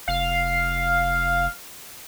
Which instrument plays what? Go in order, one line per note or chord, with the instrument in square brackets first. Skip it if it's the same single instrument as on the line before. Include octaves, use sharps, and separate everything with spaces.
[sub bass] F1 [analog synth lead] F5